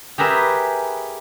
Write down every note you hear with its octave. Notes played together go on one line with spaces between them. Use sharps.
G4 G#4 A#4 B4 E5